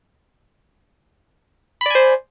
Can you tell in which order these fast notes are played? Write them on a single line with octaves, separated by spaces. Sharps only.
B5 D5 G#5 C5